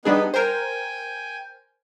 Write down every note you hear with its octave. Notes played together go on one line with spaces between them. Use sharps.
G3 B3 D4 D#4 G#4 B4
A#4 C5 G5 G#5